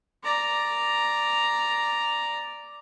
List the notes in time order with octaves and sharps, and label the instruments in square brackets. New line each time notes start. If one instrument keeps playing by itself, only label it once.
[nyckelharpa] D5 A#5